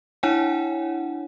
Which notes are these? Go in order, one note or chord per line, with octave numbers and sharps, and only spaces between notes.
D4 E4 C#5 F#5 G#5